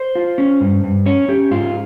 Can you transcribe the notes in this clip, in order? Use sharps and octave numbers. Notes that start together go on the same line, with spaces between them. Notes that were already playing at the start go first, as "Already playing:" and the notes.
Already playing: C5
F4
C#4
G2
G2
C#4 C#5
C#4 G4
G#2 F4